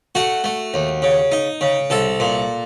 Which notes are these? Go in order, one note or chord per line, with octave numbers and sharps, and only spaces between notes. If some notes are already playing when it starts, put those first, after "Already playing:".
A3 F#4
A3
D#2
C#3
D#4
C#3
C2 A4
A#2